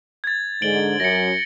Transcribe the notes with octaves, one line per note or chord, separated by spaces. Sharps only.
G#6 A6
G#2 D3 G#3 D7 F#7 G7
F#2 A#6 C#7